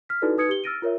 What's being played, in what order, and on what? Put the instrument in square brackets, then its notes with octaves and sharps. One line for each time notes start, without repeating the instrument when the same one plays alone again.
[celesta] F6 B6
D#4 E4 F#4 A4 B4 D5
D#4 B4 D#6 G#6 C#7
G4 G7
E6 F6 A6 A#6 D7 D#7
F4 A#4 C#5 E5